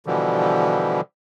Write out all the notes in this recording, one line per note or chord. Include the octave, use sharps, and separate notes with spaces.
B2 D3 E3 F3 G3